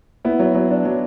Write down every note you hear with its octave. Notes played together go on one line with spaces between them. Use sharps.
B3 E4
F#3
F#3
D4
F#3